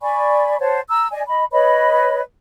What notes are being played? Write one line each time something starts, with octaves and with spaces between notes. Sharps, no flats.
D5 G#5 B5 C#6
C5 C#5 F#5 A5
A#5 E6
D5 D#5 G#5
D#5 B5
B4 C#5 D#5 B5